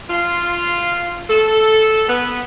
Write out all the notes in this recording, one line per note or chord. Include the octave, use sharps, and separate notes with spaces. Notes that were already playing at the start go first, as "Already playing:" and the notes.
F4
A4
B3